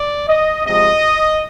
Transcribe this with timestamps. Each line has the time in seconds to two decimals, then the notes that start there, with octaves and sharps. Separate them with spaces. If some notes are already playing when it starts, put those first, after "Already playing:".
Already playing: D5
0.27 D#5
0.64 C3 F3 G#3 D#5